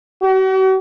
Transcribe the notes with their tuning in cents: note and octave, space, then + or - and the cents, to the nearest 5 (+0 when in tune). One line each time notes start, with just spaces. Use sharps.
F#4 +45